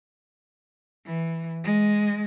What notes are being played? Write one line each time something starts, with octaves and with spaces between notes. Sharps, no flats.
E3
G#3